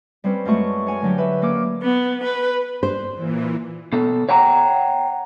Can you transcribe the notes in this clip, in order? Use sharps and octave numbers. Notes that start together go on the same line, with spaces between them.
G3 C4 C#4 B4
F#2 G#3 A3 F#4 C#6
C#5 F#5 G#5
D3 F#3 G4
B4 E5
A#3 C#4 D6 F6
B3
B4
C5
A#2 E3
B2 A4
C#5 F#5 G5 A#5